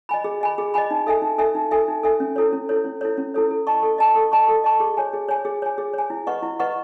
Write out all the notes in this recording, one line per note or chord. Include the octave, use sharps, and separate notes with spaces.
D#5 G#5 B5
G#4
D#5 G#5 B5
G#4
D#5 G#5 B5
D#4
A4 E5 G#5
D#4
A4 E5 G#5
D#4
A4 E5 G#5
D#4
A4 E5 G#5
C#4
E4 A4 C#5
C#4
E4 A4 C#5
C#4
E4 A4 C#5
C#4
E4 A4 C#5
A4
D#5 A5 C#6
A4
D#5 A5 C#6
A4
D#5 A5 C#6
A4
D#5 A5 C#6
G#4
C#5 G#5
G#4
C#5 G#5
G#4
C#5 G#5
G#4
C#5 G#5
E4
B4 D#5 F#5 C#6
E4
B4 D#5 F#5 C#6